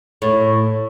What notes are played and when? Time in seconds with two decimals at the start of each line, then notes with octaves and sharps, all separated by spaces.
0.22 A2